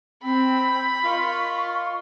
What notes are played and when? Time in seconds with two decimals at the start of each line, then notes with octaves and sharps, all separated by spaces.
0.23 C4 B5
1.04 F4 A#4 D#5 C#6